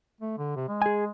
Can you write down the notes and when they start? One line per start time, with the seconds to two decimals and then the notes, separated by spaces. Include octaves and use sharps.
0.21 A3
0.38 D3
0.56 C3
0.68 G#3
0.82 G#4 G#5